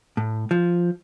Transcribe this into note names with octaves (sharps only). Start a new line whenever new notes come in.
A2
F3